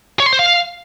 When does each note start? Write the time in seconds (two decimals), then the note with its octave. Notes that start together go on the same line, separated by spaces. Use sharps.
0.20 C#5
0.26 C6
0.33 C5
0.39 F5